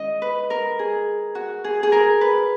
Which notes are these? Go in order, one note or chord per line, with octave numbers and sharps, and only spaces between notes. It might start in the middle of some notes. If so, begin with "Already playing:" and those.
Already playing: D#3 G#3 C#4 E4 D#5
B4
A#4
G#4
F#4
G#4
G#4
A#4
B4